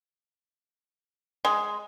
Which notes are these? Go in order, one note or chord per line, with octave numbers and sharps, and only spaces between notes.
G#3